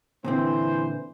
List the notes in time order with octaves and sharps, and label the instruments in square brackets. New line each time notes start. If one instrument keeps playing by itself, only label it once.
[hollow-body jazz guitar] A#2 D3 C4 [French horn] E3 [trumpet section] C5